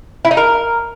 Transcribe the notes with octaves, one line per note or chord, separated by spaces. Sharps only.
E4
D#4
A#4